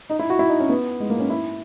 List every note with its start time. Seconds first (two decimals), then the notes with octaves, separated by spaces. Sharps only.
0.10 D#4
0.19 E4
0.30 F#4
0.39 E4
0.49 D#4
0.60 C#4
0.69 B3
1.00 G#3
1.10 A#3
1.20 C#4
1.30 E4